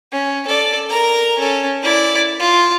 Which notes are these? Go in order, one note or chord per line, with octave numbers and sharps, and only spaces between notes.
C#4
A4 D5
A#4 A#5
C#4 A4
E4 D5
F4